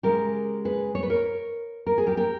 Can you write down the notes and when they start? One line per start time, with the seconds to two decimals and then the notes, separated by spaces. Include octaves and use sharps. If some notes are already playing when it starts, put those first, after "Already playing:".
0.03 C#3 G#3 G4 A#4
0.65 G#4 B4
0.95 C#5
1.03 B4
1.10 A#4 C#5
1.86 A#4
1.98 G#4
2.07 G4 A#4
2.17 G4 A#4